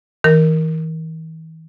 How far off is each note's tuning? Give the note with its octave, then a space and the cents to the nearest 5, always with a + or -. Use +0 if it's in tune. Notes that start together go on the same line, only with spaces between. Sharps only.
E3 -45 A#4 +0